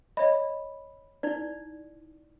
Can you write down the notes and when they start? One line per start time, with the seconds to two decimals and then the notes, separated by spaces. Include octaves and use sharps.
0.17 C#5 D#5 B5
1.23 D#4 E4 D5